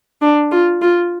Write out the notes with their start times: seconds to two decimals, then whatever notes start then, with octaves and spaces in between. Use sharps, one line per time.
0.21 D4
0.51 F4
0.82 F4